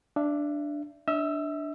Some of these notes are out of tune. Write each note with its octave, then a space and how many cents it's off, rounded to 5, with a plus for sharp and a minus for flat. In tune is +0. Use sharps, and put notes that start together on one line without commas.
D4 +0 E5 +30
D4 +0 E5 -35 E6 +30